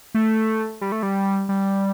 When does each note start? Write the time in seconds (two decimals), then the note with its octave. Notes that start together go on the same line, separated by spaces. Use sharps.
0.14 A3
0.81 G3
0.92 A3
1.03 G3
1.49 G3